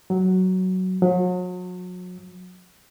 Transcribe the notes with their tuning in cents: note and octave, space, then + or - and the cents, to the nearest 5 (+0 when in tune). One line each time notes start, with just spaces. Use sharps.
F#3 +5
F#3 -40